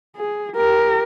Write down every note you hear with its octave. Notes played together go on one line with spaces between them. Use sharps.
G#4
G4 A#4